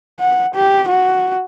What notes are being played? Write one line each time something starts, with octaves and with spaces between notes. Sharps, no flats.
F#5
G4
F#4